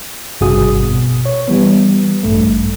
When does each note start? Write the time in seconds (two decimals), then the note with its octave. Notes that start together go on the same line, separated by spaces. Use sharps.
0.41 G#1 G2 C3 F#4 G#4 D#6
0.83 B2
1.25 C#5
1.48 E3 G3 B3
2.23 A1 G2 A3